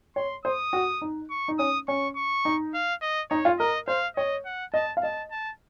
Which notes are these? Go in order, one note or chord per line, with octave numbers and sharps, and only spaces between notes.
C#5 C6
C5 D#6
F#4
D#4
C#6
D#4
C#4 D#6
C#4 C#6
C#6
D#4
F5
D#5
D#4 C#5
F4
A#4 D#5
C5 F5
C#5 D#5
F#5
D#5 A5
F5
D#5 A5
A5